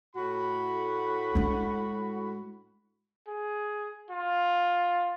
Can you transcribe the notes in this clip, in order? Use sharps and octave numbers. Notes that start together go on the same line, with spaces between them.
A2 F#4 B5
G#3 D4
G#4
F4